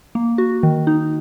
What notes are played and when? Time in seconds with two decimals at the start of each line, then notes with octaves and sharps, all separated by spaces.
0.15 A#3
0.38 F#4
0.63 D#3
0.87 D#4